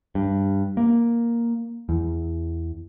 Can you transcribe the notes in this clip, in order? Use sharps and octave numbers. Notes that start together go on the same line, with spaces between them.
G2
A#3
E2